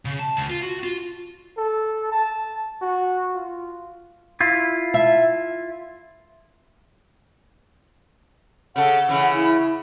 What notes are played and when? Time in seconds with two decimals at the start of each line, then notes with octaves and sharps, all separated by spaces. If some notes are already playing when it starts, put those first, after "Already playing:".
0.05 C#3
0.19 A5
0.37 C#2
0.50 F4
0.62 F#4
0.83 F4
1.58 A4
2.12 A5
2.82 F#4
3.35 F4
4.41 E4 F4
4.94 E5
8.76 C#3 A4 F#5
9.08 C#3 E3
9.32 E4